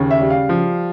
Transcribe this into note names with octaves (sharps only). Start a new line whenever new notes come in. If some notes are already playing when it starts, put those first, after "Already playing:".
Already playing: D#2 C#3
E5
G3
F5
F3